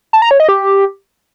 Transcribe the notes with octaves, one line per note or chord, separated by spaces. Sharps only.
A5
A#5
C#5
D#5
G4